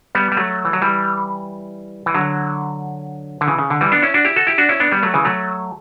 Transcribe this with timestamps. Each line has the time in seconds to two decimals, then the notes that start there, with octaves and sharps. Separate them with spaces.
0.15 G3 B3
0.32 G3
0.37 F#3 A3
0.65 E3
0.73 F#3
0.82 E3 G3
2.06 E3
2.14 D3 F#3
3.41 D3
3.47 C#3 E3
3.59 C#3
3.70 D3
3.81 E3 G3
3.92 B3 D4
4.02 C#4 E4
4.14 D4 F#4
4.25 E4 G4
4.36 F#4 A4
4.47 E4 G4
4.58 D4 F#4
4.69 C#4 E4
4.80 B3 D4
4.91 G3 B3
5.03 F#3 A3
5.14 C#3 E3
5.25 F#3 A3